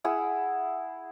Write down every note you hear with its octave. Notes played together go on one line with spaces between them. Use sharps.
E4 G#4 F#5